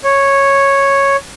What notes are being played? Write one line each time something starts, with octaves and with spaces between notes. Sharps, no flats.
C#5